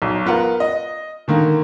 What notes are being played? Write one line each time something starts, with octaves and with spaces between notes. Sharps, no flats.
B1
B3 F4 A#4 F#5
D#5
D3 D#3 A#3